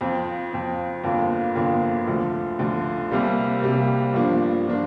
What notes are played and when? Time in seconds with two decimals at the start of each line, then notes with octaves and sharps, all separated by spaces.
0.01 F2 F3 C4
0.53 F2 F3 C4
1.04 G1 F2 D3 A#3 F4
1.55 G1 F2 D3 A#3 F4
2.07 D2 D3 F3
2.59 D2 D3 F3
3.11 C2 C3 G3 A#3
3.62 C2 C3 G3 A#3
4.13 G1 G2 F3 A#3 D4
4.67 F3 A#3 D4